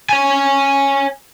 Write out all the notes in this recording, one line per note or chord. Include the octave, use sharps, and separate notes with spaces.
C#5 G#5